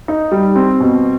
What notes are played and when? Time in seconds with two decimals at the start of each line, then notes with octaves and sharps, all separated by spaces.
0.08 D#4
0.32 G3
0.56 C4
0.80 B2